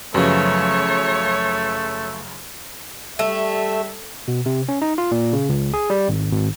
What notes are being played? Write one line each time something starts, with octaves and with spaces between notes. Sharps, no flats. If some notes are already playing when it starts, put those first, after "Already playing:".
B1 F#2 C#3 F3 A3 C#5
G3 A3 E5
B2
C3
C#4
D#4
F4
A#2
C#3
C#2
G#4
G3
G#1
G#1